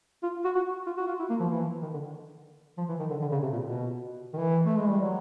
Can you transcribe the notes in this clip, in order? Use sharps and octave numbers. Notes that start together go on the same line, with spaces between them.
F4
F#4
F#4
F4
F#4
F4
E4
A#3
F3
E3
D#3
D3
F3
E3
D#3
D3
D3
C#3
C3
A#2
B2
D#3
E3
A3
G#3
G3
F#3